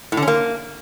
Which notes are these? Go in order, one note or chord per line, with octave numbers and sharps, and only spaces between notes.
A2
D3
C#4
A#3